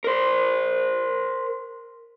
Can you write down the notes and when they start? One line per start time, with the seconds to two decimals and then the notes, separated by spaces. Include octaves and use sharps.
0.04 A#4 C5